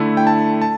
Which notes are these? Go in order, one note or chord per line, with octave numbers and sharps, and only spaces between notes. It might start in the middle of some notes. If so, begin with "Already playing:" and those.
Already playing: D3 A3 E4
G5
A5
A5